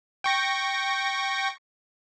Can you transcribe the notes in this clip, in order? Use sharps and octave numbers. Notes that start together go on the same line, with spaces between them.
G5 C#6 A#6